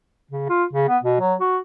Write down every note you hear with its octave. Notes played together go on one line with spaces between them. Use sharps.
C#3
F4
C#3
B3
B2
F#3
F#4